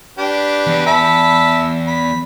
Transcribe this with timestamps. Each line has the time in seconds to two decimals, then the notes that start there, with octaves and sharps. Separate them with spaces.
0.18 D4 G4 B4
0.67 E2
0.86 E5 A5 B5
1.87 B5